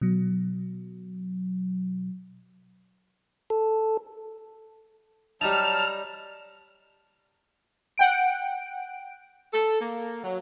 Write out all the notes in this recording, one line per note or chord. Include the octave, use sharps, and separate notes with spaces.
B2 F#3
A4
F#3 G3 D#4 A5 F6
F#5 G5 D7
A4
A#3
F#3